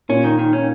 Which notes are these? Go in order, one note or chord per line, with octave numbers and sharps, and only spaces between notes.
A#2 C#4
D#3
D#3
C#4